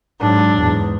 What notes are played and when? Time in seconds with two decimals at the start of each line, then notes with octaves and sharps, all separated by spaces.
0.21 G#2 F#3 D4
0.59 E2 G#2